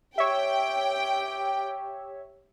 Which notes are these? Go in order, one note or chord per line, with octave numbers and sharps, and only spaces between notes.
G4 C#5 E5 G5